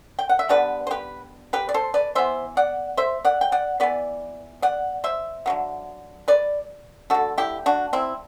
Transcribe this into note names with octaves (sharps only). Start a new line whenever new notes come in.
G5
F#5
E5
D3 G3 B3 B4 D5
C5
G4 B4
G4 B4
D5
A4 C5
B4 D5
E3 B3 C5 E5
D5 F#5
C5 E5
D5 F#5
G5
D5 F#5
E3 B3 B4 D5
D5 F#5
C5 E5
D3 F#3 B3
B4 D5
D3 A3 F#4 A4
E4 G4
D4 F#4
C4 E4